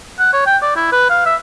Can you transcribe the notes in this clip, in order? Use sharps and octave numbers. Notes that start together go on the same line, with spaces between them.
F#5
C#5
G5
D5
E4
B4
F5
E5